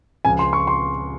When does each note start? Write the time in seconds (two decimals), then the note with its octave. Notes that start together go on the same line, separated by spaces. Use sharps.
0.25 C#2 C#3 F3 G#5
0.39 C6
0.53 C#6
0.67 C6